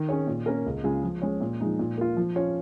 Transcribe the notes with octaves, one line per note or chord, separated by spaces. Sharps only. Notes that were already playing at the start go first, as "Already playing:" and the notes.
Already playing: D#3
C#4 G#4 C#5
A#2
A#3 C#4 A#4
C#2
C#3 G#3 F4 G#4
F3
G#3 C#4 G#4 C#5
A#2
F3 G#3 D#4
A#2
A#3 F4
F3
C#4 F4 C#5